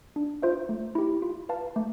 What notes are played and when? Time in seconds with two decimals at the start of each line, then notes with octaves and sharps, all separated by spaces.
0.16 D4
0.42 F4 C5 E5
0.69 A3
0.95 E4 G4
1.22 F4
1.49 B4 F5 A5
1.76 A3